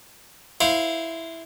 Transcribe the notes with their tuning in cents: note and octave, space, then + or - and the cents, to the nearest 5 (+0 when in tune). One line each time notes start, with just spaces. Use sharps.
E4 +0 C5 -15 F5 +0